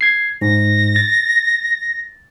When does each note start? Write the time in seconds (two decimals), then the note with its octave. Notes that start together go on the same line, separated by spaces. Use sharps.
0.01 G#6 C7
0.41 G#2 A#6
0.96 A6